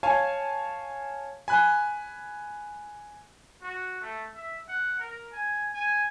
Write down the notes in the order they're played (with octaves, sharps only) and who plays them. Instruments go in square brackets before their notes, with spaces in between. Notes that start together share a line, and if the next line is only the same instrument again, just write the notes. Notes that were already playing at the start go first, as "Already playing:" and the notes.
[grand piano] C#5 F5 G#5 A5
[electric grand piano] G#5 B5 F#6
[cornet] F#4
A3
E5
F#5
A#4
G#5
G#5